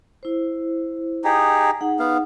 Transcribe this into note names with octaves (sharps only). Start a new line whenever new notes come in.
E4 C5
D#4 G4 G#4
D#4 G#4 F#5
B3 F5